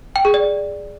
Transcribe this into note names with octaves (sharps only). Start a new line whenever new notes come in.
G5
G#4
D5